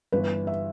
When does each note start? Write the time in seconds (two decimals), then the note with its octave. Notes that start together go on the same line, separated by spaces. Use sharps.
0.12 G1 G2 E3 B4
0.47 E5